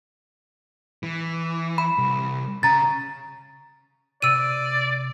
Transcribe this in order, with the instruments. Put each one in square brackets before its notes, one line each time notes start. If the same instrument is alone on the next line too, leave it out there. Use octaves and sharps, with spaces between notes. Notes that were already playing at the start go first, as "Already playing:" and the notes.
[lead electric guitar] E3
[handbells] B5
[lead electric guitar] C2
[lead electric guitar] C#3 [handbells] A#5 A6
[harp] C3 [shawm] D5 [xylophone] E6 D#7